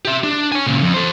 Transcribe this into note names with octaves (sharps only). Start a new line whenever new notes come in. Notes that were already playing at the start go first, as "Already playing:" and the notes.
G4 E5
D4
C#5 G#5
A#2 C#3
F2
A4 C5